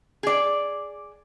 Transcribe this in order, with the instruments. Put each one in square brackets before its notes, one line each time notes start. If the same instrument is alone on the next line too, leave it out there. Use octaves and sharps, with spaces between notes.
[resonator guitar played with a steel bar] G#4 D5